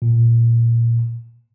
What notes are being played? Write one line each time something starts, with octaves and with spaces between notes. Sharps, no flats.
A#2